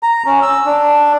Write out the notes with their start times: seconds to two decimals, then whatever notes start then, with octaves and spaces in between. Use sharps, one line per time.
0.03 A#5
0.26 C#4
0.42 E6
0.66 D4